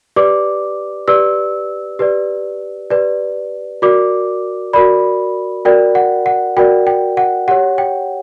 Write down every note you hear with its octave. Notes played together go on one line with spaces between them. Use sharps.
G4 B4 D5 D6
G4 B4 D5 E6
G4 B4 D5
G4 B4 D5
F#4 A#4 D5 D6
F#4 A#4 D5 B5
F#4 A#4 D5 G5
F#5
F#5
F#4 A#4 D5 G5
G5
F#5
G4 C#5 F#5
G5